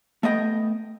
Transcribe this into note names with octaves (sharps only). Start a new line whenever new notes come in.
A3 B3 D#5 G5